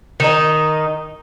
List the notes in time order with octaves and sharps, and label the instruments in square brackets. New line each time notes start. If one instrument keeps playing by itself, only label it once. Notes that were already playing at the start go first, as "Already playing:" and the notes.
[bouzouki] D#3 D#4